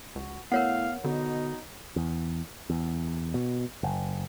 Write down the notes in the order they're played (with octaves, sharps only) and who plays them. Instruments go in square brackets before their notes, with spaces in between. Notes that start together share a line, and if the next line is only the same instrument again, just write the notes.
[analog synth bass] C#2 [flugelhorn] F#4
[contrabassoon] A2 [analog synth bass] B3 [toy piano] A#4 C#5 F#5 [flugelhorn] F5
[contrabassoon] B2 [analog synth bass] D3 [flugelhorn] D#4
[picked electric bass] E2
E2
B2
F#1